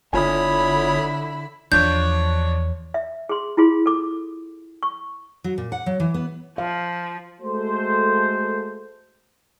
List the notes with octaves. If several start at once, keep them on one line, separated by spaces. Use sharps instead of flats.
G1 D3 E4 F4 C#5 G#5 B5 D#6
E2 F3 D4 C#5 G6
E5
G#4 C6
E4 F4 G#4 C6
A4 D6
C#6
F#3
A#2
F#5
F#3
E3
B3
F3 F5
G#3 A3 F#4 A4 C5